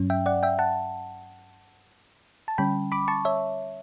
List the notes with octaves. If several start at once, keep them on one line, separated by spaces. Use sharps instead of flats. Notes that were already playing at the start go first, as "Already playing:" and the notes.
Already playing: G2 F#3 C#4
E5 G5
D5 F#5
E5 G5
F#5 A5
A5
D3 G3 C#4 G5 B5
B5 D6
A5 C#6
C#5 E5